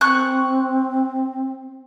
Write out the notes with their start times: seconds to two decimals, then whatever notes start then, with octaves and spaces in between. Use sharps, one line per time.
0.01 C4 C#6 F#6